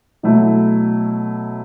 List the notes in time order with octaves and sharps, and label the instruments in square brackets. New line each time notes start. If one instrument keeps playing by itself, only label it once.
[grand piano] B2 F#3 A3 E4